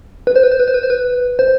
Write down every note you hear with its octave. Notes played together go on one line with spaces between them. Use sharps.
B4
C5
B4
C5
B4
C5
B4
C5
B4
C5